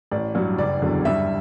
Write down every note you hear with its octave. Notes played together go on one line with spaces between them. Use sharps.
A1 D5
G2 F#3
F#1 D5
E2 D3 F#3
G2 E5